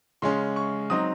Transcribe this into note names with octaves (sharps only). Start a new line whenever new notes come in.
C#3 G#3 C#4 C6
C#6
F#3 C4 D#4 D#6